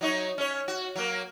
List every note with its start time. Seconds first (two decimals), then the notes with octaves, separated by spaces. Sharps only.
0.01 F#3 D#4 C#5
0.38 C#4 C#5
0.68 F#4
0.96 F#3 A#3